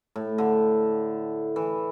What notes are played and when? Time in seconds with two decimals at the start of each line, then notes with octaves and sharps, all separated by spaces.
0.16 A2
0.38 D3
1.56 E3